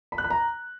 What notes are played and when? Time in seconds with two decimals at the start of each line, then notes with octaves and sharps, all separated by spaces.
0.12 B5
0.18 F#6
0.24 B5
0.30 A#5